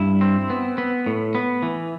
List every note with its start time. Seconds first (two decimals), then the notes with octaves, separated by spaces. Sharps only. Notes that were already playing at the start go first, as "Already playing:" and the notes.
Already playing: G2 E4
0.21 C4
0.50 B3
0.78 B3
1.06 A2
1.35 B3
1.63 E3